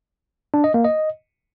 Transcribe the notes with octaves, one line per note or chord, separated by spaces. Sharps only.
D4
D#5
A#3
D#5